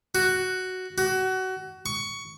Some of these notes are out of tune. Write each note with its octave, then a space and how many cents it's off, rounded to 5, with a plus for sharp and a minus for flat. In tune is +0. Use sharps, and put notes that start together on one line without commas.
F#4 +5
F#4 +25
C#6 +15